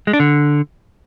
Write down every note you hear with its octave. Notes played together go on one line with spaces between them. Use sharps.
G#3
D4
D3